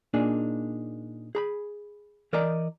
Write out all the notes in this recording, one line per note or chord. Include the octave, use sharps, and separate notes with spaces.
A#2 A#3 D4 D#4 G#4
G#4 A#5 B5
E3 A#4 D5 D#5 A#5